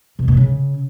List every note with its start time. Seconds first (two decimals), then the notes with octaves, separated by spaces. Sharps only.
0.19 B2
0.28 A#2
0.37 C#3